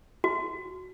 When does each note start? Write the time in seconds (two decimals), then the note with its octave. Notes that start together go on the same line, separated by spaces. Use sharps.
0.24 F#4